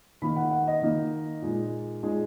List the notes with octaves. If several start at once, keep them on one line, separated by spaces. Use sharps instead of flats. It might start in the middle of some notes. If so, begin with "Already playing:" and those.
D#3 A#3 D#4 B5
F#5
F#5
D#5
D#3 A#3 D#4
A#2 G#3 D#4
A#2 G#3 D#4 G#4